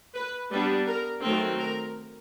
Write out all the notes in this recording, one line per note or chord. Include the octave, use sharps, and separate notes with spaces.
B4
G3 B3 D4 B4
A#4
D#3 F#3 A3 C4 A#4
A#4